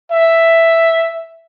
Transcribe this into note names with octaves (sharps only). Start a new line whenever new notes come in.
E5